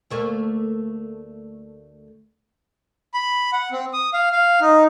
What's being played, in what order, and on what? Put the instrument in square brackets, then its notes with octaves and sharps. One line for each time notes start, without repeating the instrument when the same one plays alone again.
[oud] D2 A3 A#3
[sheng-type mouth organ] B5
F#5
C4
D#6
F5
F5
D#4